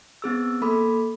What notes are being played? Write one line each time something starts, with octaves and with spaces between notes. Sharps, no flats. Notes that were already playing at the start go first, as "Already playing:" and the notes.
B3 C4 G#4 E6
A#3 A4 B5 D6